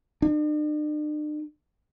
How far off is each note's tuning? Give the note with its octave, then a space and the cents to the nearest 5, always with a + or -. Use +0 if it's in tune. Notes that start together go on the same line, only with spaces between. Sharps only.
D4 +45